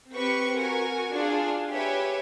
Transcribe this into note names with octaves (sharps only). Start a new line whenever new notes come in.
C4 G4 B4 C#6 C#7
F#4 A#4 G#5 C#6
D4 F4 G#4 F5
G4 B4 C#5 E5 G#5